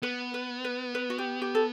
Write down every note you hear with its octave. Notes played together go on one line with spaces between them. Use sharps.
B3 B4
B4
B4
B4
F#4
G4
G4
A4